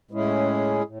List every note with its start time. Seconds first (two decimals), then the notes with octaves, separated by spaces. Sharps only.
0.11 A2 G#3 C#4 E4 G#4
0.84 A2